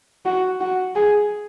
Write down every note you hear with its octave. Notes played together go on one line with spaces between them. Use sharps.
F#4
F#4
G#4